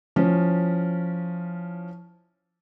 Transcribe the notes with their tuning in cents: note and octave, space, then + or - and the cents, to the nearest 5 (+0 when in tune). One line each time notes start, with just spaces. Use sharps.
F3 +0 C#4 +5 E4 +0